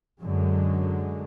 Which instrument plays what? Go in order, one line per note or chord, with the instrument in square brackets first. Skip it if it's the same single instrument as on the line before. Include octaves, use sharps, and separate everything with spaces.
[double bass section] F#2 D3 F#3 G#3